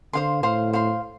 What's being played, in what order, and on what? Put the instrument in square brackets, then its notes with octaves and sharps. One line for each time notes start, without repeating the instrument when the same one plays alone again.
[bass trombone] D3 [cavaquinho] C5 F5 C6
[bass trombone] A2 [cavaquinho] C5 F5 C6
[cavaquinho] C5 F5 C6